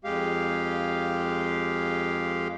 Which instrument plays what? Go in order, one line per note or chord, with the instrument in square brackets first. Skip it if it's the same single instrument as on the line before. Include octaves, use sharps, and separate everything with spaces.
[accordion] F2 G#3 G4 F5